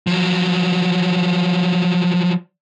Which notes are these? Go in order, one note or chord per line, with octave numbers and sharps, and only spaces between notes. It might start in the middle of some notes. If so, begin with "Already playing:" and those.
F3 F#3